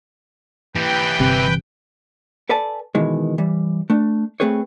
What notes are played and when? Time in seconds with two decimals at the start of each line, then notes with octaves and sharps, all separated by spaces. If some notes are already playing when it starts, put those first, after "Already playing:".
0.76 E3 G4 B4 G5
1.19 G1 C3
2.49 A4 B4 D5 G#5 A5
2.95 B2 D#3 E3 G#3
3.38 E3 G3
3.90 A3 D4
4.40 A3 C4 G#4 B4 C#5